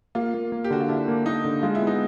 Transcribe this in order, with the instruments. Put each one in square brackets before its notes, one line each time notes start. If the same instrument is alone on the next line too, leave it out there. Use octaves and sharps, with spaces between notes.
[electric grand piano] A#3 [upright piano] F4
[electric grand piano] A#3
A#3
[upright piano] G4
[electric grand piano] D3 [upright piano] F#4
[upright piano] F4
[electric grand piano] D4 [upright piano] E4
[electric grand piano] A#3
[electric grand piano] A#3 [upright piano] D#4
[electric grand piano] D3
[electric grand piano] G#3 [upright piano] F4
[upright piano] E4
[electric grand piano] B3
[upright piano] D#4